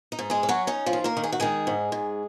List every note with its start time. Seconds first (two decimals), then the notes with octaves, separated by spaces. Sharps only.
0.12 D#4
0.19 G#2
0.30 G#3 G#4
0.43 C#4
0.49 F#3 F#4
0.67 C#4 D#4
0.86 F3 F4
0.93 D#3
1.04 A#3 A#4
1.17 D#3
1.24 G#4
1.32 F#4
1.40 D#3 G#3 G#4
1.67 G#2
1.92 G#2